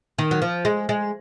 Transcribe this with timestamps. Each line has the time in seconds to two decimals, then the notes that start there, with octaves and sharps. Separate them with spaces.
0.18 D#3
0.31 F#3
0.42 F3
0.65 G#3
0.89 G#3